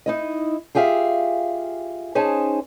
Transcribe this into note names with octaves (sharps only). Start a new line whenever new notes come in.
D#4 E4 D#5
F4 G4 G#4 E5 F5
C#4 D#4 G#4 C5 G#5 A5